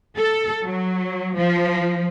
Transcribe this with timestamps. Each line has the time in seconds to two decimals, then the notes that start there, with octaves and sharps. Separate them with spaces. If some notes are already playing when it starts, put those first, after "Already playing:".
0.18 A4
0.65 F#3
1.38 F3